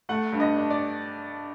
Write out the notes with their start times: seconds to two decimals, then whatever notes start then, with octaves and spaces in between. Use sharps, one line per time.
0.09 A3 F#5
0.32 G2
0.40 D#5
0.56 D4
0.70 D5